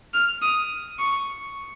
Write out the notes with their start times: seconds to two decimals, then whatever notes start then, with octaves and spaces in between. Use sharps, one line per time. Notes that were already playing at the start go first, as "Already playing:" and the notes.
0.14 F6
0.42 D#6
0.99 C#6